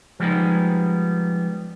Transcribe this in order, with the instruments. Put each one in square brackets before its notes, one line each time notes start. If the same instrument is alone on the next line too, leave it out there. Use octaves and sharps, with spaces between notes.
[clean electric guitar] F3 G3 G#3 B3 D#4